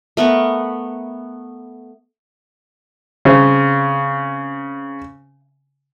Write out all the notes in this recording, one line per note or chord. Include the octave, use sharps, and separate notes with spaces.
A3 B3 A#4 C#6
C#3 C4